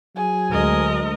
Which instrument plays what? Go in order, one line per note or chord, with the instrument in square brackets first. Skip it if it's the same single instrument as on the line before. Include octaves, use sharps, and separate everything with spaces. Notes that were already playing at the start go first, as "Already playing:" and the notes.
[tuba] F#3 [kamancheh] G#4 G#5
[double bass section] D2 G#3 [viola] A#4 D#5